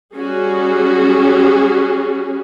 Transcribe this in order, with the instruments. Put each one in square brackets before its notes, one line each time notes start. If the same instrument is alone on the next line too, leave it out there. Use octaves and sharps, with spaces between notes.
[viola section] G3 C#4 F#4 G#4